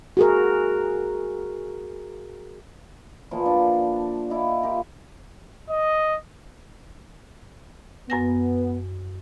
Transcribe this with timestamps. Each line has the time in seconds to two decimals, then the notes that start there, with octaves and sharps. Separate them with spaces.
0.17 F#4 G#4 A#4
3.31 A#2 E3 F3 B3
3.46 D4
4.30 E4 D#5 F5
4.63 F4 G4 A#4
5.69 D#5
8.10 F#2 B3 G#5 A#6